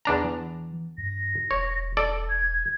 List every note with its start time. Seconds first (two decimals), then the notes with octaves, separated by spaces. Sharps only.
0.05 E2 D4 A#5
0.24 E3
0.98 G2 A#6
1.51 E1 C#5
1.97 A4 D5
2.29 G#6